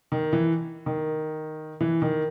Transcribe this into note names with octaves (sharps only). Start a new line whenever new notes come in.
D#3
E3
D#3
E3
D#3